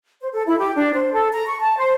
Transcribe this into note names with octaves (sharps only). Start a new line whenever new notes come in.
C5
A4
E4
G4
D4
C5
A4
A#5
C#6
A5
C5